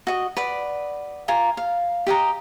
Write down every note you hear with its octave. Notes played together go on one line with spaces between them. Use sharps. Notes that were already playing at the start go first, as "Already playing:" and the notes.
F#4 D#5
B4 D5 F#5
F4 G#5 A#5
F5
G4 D#5 F5 A#5